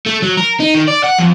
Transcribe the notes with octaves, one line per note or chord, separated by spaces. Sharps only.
A3
F#3
A#4
D#4
D#3
D5
F#5
F2